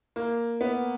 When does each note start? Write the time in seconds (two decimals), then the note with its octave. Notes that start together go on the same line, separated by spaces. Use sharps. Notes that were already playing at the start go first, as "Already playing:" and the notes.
0.16 A#3
0.61 B3